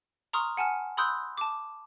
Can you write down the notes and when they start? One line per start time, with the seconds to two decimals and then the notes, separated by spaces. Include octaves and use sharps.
0.33 A#5 C6 C#6 D#6 F6
0.57 F#5 G#5 A5 F6
0.97 B5 C6 D#6 E6 F#6 G6
1.38 A5 D6